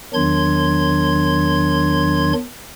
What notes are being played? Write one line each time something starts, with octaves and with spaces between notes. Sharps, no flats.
E2 D#3 F#3 D4 C6 G#6